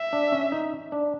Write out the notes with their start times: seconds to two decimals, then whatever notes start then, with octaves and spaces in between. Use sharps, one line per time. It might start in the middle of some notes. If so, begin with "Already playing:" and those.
Already playing: E5
0.13 D4
0.32 C#4
0.52 D#4
0.92 D4